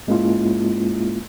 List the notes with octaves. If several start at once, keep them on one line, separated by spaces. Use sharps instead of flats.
G#2 G#3 A#3 C#4 E4 F4